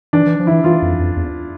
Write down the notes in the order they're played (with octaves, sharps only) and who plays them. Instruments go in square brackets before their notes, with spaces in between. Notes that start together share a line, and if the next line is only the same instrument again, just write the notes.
[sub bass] E3 [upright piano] D4
[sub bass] E3
F3
[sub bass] E3 [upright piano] E4
[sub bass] E3 [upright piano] F4
[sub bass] F2
F2
E2